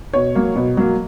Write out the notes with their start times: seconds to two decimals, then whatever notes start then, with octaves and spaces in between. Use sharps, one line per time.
0.13 B2 C#5
0.35 F#3 A#3
0.56 B2
0.77 F#3 A#3